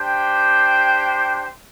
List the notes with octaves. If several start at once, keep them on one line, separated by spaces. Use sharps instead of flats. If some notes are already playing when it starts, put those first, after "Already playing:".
Already playing: D4 G4 C5 G5